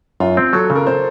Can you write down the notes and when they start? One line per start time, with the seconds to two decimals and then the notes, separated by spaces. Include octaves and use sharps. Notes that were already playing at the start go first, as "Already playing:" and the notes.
0.20 F#2 F4
0.37 C4
0.53 F#3 A4
0.70 C#3
0.76 A#4
0.86 C5